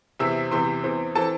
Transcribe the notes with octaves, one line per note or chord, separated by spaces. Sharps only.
E2 C3 E3 C4 E5 E6
E2 C3 E3 C4 C5 C6
E2 E3 C4
E3 C4 A4 A5